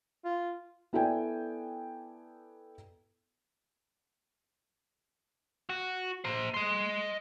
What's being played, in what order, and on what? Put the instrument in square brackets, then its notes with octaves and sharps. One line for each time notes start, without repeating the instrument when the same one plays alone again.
[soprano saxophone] F4
[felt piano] B3 E4 A4 D5 G5 G#5
[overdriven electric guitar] F#4
C5 A#5
D#5 C6